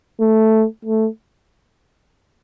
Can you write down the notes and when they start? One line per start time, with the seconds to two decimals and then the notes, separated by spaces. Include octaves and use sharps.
0.20 A3
0.85 A3